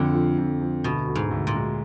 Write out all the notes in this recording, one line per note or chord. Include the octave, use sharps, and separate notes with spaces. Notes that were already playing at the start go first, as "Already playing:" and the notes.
Already playing: F2 D3
F3
F2
F3
D2 B2
D2
G#2
D2
A#2
G#3